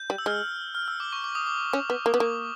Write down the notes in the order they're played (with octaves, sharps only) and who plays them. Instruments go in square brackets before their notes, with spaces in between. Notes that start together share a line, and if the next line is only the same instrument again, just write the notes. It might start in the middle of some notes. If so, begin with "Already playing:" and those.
Already playing: [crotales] G6
[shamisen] G3
[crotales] E6
[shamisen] G#3 [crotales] F6
[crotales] F6
E6
D6
C#6
D6
D#6
D6
[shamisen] C#4 [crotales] C#6
[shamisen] B3
A#3
B3
[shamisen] A#3 [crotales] D6